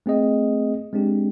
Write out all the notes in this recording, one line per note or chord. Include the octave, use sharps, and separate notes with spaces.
A3 C4 G#4 D#5
G#3 C4 D4 G4